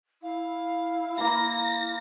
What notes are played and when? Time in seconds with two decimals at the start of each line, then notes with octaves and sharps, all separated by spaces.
0.22 E4 F5
1.18 A#3 A#5 B5 A#6